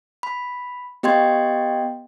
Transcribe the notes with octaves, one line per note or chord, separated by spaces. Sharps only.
B5
B3 G4 D#5 G5 C6 G#6